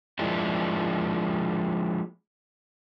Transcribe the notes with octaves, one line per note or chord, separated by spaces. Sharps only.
F3 G#3 A#3 D4 E4